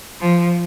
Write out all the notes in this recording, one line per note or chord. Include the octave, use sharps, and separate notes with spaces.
F3